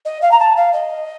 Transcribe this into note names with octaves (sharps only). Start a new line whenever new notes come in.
D#5
F5
A#5
A5
F5
D#5